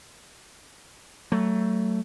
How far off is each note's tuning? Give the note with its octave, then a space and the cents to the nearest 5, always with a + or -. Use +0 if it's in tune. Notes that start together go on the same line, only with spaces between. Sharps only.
F#3 +35 A3 +15